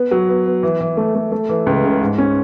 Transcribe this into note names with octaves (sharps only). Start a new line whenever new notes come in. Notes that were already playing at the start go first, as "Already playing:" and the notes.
Already playing: B3
F#3
B3
B3
E3
E3
A3
A3
A3
E3
C#2
C#3
G#2
C#4